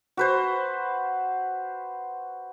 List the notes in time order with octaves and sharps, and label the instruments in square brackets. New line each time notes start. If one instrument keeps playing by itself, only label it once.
[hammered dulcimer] F#4 B4 C5